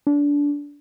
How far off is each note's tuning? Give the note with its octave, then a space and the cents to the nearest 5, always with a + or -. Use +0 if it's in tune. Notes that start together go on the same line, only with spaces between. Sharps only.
D4 -25